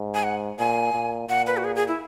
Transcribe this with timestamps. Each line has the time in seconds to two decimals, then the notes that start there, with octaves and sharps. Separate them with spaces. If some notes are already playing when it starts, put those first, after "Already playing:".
Already playing: G#2
0.15 G#5
0.23 F#5
0.59 A#2 G#5
0.93 A#2
1.29 A#2 F#5
1.47 B4
1.57 F#4
1.64 G#4
1.76 G#4
1.88 E4